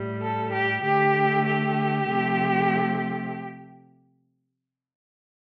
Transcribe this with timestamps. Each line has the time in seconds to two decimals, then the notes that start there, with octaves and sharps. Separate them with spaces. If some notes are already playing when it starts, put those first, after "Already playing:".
Already playing: A2 G3
0.21 A4
0.52 G4
0.83 D3 A3 G4
1.45 G4
2.07 C3 F3 A3